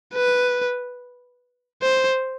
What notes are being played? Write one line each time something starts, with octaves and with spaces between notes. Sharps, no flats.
B4
C5